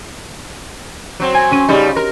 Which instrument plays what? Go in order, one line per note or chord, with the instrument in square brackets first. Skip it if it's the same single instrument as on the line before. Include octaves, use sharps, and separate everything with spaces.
[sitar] F#3 C4
[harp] G#5
C#4 D#7
[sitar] C#3 G3 D#4
A#4